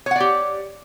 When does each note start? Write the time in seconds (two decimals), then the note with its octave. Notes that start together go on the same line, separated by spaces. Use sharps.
0.06 C#5
0.11 F#5
0.16 D5
0.20 G4